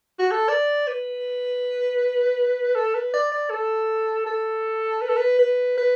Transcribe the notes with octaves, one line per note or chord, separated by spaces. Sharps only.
F#4
A4
D5
B4
A4
B4
D5
D5
A4
A4
B4
A4
B4
B4
B4